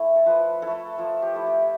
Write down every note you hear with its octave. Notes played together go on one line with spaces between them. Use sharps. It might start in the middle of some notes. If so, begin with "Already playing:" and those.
Already playing: A3 E4
A4
F3 B4
A3 E4 A4
F3 A4
G4
A3 E4
G4
E5